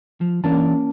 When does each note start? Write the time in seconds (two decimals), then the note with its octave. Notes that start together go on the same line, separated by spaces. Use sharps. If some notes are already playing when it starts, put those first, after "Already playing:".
0.21 F3
0.44 E3 A#3 C#4 D4 A5